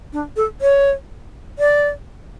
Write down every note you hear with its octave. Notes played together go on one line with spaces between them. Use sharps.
D4
A4
C#5
D5